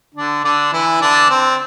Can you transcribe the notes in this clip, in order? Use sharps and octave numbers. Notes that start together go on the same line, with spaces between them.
D3 D4
D3 D4
E3 E4
D3 D4
C4